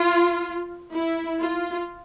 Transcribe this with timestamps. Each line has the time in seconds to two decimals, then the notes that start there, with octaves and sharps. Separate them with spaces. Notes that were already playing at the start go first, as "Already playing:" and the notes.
Already playing: F4
0.94 E4
1.41 F4